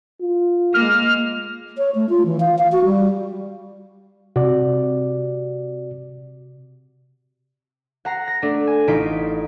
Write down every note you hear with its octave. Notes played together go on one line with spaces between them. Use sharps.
F4
G#3 A#3 F6
C#5
A3
F4
E3
F5
F5
F#4
G3
C3 F#4 D5
F#5 A#5 C7
A#6
A3 D4
G#5
A1 D#4 F4 B6 D7